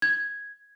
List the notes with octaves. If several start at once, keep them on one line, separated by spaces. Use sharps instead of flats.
G#6